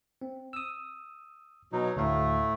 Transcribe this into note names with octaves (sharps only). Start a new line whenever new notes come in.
C4
D#6 E6
B2 F#3 D#4
D2 A2 A3 F5